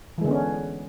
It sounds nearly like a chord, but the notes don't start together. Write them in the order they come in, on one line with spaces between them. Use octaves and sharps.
E3 G#3 D3 B3 C#4